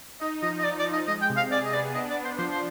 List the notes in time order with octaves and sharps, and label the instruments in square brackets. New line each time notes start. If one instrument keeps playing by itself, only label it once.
[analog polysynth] D#4 [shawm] D#5
[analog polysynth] F3 [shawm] D#5
[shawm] D#5
[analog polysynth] D#4 [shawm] D5
[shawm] D5
[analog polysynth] F3
[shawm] D#5
[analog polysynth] G#3 [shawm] D#5
[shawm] G5
[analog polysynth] C3
[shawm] F5
[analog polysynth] G#4 [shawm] D5
[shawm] D#5
[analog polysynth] B3 [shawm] D5
[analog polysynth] D4 [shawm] D#5
[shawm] D5
[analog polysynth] D4
[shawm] C5
[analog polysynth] F3 [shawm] C5
[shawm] C5